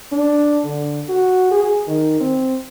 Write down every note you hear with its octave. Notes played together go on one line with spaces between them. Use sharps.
D4
D3
F#4
G#4
D#3
C4